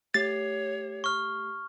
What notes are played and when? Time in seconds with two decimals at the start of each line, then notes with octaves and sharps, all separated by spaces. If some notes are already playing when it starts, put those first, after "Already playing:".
0.14 A3 G4 C#5 A6 C7
1.04 C#6 F6